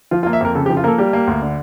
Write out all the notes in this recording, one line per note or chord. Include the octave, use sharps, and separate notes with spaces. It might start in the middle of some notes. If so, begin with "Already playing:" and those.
F3 F4
F4
A#3
E5
F2 A#4
C#3 A4
G4
F3
F4
A#3 A4 A#4
G3 G4
A#3
D2
D3